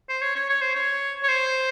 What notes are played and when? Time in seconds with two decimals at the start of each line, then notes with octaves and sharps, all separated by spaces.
0.09 C5
0.22 C#5
0.35 C#5
0.49 C#5
0.61 C5
0.76 C#5
1.23 C#5
1.29 C5